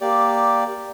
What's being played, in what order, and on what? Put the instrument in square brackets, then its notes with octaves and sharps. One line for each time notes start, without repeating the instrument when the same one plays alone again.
[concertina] A#3 G4 D5